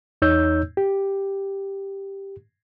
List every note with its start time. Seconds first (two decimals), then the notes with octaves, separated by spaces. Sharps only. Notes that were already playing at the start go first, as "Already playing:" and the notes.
0.22 E2 D#4 C#5 E6 G6
0.77 G4